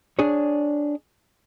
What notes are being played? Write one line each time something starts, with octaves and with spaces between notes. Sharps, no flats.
D4 G#4 C#5